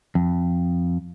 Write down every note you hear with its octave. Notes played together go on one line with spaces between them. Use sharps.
F2